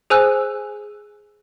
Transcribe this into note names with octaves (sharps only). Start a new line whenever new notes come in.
G#4 C5 G#5 E6 F#6